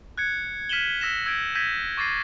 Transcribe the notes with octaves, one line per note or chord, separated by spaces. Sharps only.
F#6 G#6 C#7
F6 B6 D#7 E7 F#7 G7
E6 A#6 B6 E7
E6 G6 G#6 A#6 D7
E6 G6 G#6 A#6 B6 D#7
C#6 D6 A6 A#6 C7 D#7